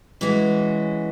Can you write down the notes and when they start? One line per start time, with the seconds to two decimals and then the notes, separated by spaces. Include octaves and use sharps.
0.21 E3 G#3 C#4 F#4